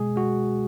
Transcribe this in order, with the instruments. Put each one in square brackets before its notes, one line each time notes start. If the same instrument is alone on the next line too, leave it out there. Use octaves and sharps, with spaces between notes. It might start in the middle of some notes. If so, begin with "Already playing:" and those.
Already playing: [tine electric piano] B2 G#3 G#4
G#3 F#4